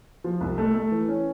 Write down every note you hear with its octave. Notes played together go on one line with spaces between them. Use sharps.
F3
C2
A3
A3
E3
C#4